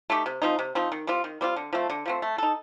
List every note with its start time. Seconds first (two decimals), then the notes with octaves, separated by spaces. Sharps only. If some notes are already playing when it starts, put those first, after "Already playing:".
0.10 A3 D#4 G4
0.26 C3
0.42 F3 C4 D#4
0.59 C3
0.75 F3 C4 D#4
0.92 D#3
1.07 G3 C4 F4
1.24 D#3
1.41 G3 C4 F4
1.57 D3
1.73 F3 A3 C4
1.90 D3
2.06 F3 A3 C4
2.22 A3
2.38 D#4 A4